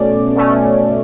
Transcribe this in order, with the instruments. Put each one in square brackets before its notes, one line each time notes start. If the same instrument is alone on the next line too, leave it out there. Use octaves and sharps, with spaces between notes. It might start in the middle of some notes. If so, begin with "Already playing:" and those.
Already playing: [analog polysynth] B2 A3 C#4 D5
B2 A3 C#4